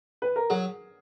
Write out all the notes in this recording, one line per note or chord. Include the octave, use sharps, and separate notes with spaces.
B4
A#4
F#3 G#4